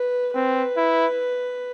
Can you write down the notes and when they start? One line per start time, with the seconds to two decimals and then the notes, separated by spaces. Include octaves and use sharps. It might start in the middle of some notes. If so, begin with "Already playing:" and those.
Already playing: B4
0.35 C4 B4
0.77 E4